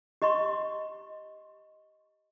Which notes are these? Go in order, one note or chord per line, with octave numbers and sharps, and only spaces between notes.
G4 D#5 A#5 C6 C#6